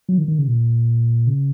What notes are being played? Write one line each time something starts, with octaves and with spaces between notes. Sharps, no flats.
F#3
D#3
D#3
C#3
A#2
C#3